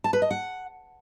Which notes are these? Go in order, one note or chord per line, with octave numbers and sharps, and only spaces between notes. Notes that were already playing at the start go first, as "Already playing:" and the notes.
A5
B4
D#5
F#5